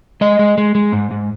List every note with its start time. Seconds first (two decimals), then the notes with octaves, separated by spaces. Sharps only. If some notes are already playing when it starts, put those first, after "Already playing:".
0.21 G#3 D#5
0.39 G#3
0.58 G#3
0.75 G#3
0.92 G#2
1.11 G#2